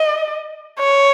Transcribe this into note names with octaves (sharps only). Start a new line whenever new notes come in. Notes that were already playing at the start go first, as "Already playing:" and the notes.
Already playing: D#5
C#5